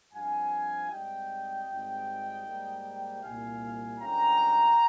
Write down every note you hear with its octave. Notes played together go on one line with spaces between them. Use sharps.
G2 F3 C4 F5 G#5
G#2 G3 C4 D#5 G5
G#1 G#2 G3 C4
G#2 G3 A#3
C2 A#2 G3 F5 G#5
G1 G2 D#3 G#3 C#4 G5 A#5